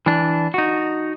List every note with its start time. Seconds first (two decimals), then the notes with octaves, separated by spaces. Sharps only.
0.06 E3 D4
0.54 D#4 F#4